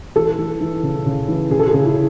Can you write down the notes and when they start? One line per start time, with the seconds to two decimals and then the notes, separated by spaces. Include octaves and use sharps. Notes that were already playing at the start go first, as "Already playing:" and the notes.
0.16 E3 A4
0.38 E3
0.61 E3
0.83 C#3
1.06 C#3
1.28 E3
1.50 C#3 G#4
1.59 A4
1.68 G#4
1.73 C#3
1.85 E4